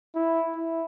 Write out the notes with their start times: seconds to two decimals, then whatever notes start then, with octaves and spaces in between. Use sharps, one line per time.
0.15 E4
0.56 E4